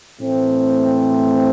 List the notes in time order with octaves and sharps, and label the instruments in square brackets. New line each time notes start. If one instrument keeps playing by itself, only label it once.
[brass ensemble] A2 E3 A3 C4